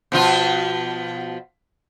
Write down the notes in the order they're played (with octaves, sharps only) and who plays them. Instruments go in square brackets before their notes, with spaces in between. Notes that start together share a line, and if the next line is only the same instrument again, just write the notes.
[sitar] B2 F3 F4